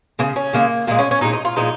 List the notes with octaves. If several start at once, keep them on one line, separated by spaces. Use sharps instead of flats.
C#3 G#3 A#3
C#4
C#3 G#3 A#3
A#2 G#3 A#3
C#4
C#4
A#2 G#3 D#4
D#4
F4
A#2 F3 G#3 D#4